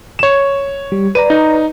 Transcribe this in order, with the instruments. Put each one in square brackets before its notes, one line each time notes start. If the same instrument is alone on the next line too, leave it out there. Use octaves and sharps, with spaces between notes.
[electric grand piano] C#5 E7
[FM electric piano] G3
[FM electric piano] B4 D5 A#5 [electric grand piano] D#7
[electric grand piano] D#4